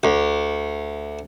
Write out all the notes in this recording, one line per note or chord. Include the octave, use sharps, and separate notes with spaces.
D2